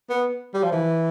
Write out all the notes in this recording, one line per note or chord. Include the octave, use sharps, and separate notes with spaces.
B3
G3
F3
E3